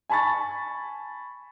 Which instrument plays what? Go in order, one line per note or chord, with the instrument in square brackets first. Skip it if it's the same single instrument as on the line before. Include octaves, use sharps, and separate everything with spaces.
[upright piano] G#5 A5 B5 C#6 A6